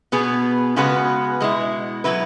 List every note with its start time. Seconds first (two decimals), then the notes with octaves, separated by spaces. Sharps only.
0.12 B2 B3 G#4 B4
0.76 C#3 G#3 B3 F#4 B4
1.40 B2 G#3 E4
2.04 B2 F#3 E4 B4